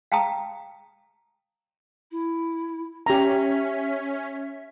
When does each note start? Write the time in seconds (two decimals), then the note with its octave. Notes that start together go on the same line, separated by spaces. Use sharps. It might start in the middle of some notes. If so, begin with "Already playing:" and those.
0.12 F5 G5 A5 A#5 D#6
2.11 E4
3.06 C#4 G4 E5 A#5